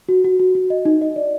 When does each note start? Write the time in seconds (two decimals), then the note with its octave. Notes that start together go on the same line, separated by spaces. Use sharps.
0.09 F#4
0.25 F#4
0.39 F#4
0.55 F#4
0.70 D#5
0.85 D#4
1.01 D#5
1.16 D5